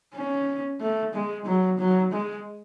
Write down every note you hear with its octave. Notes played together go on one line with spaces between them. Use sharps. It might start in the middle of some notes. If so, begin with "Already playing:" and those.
C#4
A3
G#3
F#3
F#3
G#3